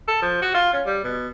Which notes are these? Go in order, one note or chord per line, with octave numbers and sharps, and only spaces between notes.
A4
F3
F#4
F4
C#4
G3
B2